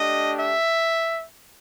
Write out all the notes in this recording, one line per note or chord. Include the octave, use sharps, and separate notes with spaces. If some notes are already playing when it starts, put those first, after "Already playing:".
Already playing: A3 D4 G4 D#5
E5